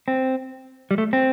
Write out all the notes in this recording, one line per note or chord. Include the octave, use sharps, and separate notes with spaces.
C4
G3
A3
C4